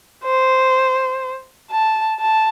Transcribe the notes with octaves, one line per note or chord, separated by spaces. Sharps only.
C5
A5
A5